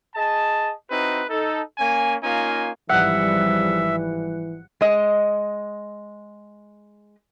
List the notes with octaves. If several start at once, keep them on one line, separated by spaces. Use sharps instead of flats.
G#4 D#5 A5
C4 D#4 E4 F#4 B4
D#4 A4
A#3 C#4 G#5
A#3 C#4 D#4 F4 G#5
G#1 E3 F3 G3 E5 F#5
G#3 D#5